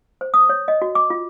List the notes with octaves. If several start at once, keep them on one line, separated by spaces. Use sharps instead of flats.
C5
D#6
C#5
D#5
F#4
D6
F4